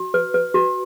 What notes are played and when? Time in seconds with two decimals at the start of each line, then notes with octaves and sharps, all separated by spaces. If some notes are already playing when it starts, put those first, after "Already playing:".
Already playing: F#4
0.14 B4
0.34 B4
0.54 F#4